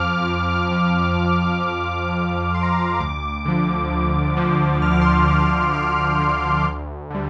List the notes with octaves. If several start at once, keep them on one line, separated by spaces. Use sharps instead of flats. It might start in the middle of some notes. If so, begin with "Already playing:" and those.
Already playing: F2 F3 D6 F6
F2 F6
F6
F3 F6
F6
F2
F6
F6
F3
F6
F2 D6
F3 C6
A#5
C6
D2 D6
D3 F3
D2
D3 F3
D2 F6
D6
C6
D6
D3 F3 D6
D2 D6
D3 F3 F6
D2
D3 G3